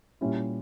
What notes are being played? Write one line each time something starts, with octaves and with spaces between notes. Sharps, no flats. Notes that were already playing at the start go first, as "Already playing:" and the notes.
A#2 G3 C#4 E4